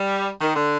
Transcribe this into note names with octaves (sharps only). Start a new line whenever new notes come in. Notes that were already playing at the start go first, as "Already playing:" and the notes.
Already playing: G3
D#3
D3